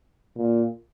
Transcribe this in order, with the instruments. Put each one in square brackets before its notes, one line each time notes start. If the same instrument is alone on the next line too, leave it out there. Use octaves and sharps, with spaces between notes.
[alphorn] A#2